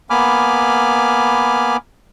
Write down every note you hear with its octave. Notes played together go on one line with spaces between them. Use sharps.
A#3 B3 G#5 B5 D6 F6